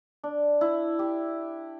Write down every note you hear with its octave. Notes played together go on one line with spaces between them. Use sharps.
D4
E4
G4